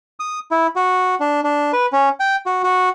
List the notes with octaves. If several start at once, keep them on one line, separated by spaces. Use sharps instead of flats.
D#6
E4
F#4
D4
D4
B4
C#4
G5
F#4
F#4